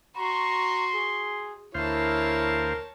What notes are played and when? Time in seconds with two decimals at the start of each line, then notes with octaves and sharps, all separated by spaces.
0.17 F#4 A#5 C6 C#6
0.94 G#4
1.74 D2 E4 A#4 C5 C#5 F5 A5